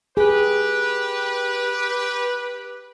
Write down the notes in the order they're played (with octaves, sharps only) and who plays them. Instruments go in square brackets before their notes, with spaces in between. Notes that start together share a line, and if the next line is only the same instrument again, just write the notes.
[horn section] G4 B4 [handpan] G#4